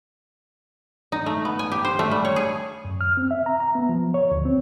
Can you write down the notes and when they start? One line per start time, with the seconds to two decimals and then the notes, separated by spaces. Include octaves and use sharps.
1.12 D#4
1.26 A3
1.45 B3
1.59 G#5
1.72 G4
1.85 C5
1.99 A3
2.11 G3
2.25 C#5
2.36 G#4
2.85 F#2
3.01 F6
3.17 C4
3.31 E5
3.46 A#5
3.60 A#5
3.75 B3
3.89 F3
4.14 C#5
4.31 D2
4.45 C4